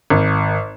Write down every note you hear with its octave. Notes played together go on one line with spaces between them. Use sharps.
G#1